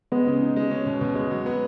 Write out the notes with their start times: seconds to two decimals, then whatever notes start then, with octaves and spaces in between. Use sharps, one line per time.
0.12 G#3 B3
0.27 C#3
0.41 D#4
0.56 G#3
0.71 C#4
0.86 B2
1.01 B2
1.15 G#3
1.31 F#3
1.46 B3